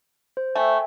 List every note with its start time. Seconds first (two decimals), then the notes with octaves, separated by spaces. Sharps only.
0.37 C5
0.55 A3 E5 G5 G#5